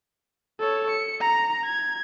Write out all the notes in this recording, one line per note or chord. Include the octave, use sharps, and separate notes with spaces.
A4 C#5
C#7
A#5
G#6